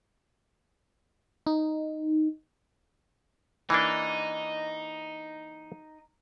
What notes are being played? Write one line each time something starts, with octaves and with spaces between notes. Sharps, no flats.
D#4
E3 A#3 D4 D#4